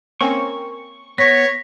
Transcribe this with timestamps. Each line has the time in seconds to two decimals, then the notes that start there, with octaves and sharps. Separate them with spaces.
0.21 A#3 C4 C#4 C#6
1.18 B3 C#5 A#6 B6